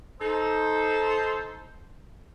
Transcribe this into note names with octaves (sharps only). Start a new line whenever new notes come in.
D#4 A4 C5